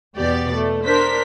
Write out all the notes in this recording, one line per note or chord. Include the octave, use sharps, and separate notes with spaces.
E2 B2 G4 D5
A3
D4 A#4 C5 B6